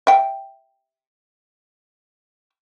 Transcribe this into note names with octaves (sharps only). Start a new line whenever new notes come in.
E5 G5